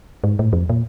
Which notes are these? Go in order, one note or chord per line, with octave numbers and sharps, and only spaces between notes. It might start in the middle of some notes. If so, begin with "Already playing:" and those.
G#2
A2
F2
A#2